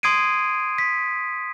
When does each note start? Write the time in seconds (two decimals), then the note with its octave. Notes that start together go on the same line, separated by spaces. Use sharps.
0.03 C6 D#6 G#6 C7 D7 D#7
0.78 B6